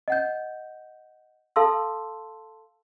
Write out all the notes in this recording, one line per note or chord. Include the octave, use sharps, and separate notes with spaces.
D#5 F#5 G6
A4 F5 A5 C6 E6